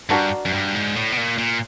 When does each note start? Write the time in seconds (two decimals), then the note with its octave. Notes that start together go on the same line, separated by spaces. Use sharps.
0.09 G2 D4 F#4 A#4 D5
0.46 F#2
0.53 G2
0.75 G#2
0.96 A2
1.12 B2
1.18 A#2
1.38 A#2